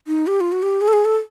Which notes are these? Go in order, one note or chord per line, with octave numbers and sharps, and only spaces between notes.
D#4
G4
F4
F#4
G4
G#4
A4
G#4
A4